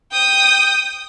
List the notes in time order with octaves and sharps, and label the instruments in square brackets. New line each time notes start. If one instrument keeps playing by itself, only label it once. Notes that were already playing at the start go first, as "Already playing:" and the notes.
[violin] G5 D#6